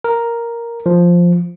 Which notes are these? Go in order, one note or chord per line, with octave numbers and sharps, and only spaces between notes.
A#4
F3